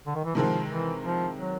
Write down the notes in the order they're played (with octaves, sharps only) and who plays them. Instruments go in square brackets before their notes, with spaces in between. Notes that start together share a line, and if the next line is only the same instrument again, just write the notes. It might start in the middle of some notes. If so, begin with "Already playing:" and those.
[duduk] D3
D#3
E3
[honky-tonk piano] C3 D#3 G#3 C4 [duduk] F3
[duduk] E3
F3
F#3